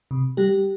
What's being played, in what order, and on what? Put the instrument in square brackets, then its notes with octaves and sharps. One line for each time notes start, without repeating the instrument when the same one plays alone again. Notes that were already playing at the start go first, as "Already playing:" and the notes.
[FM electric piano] C3
G3 G4